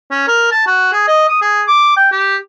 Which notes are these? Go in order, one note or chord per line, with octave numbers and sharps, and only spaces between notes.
C#4
A#4
A5
F#4
G#4
D#5
D#6
G#4
D6
G5
G4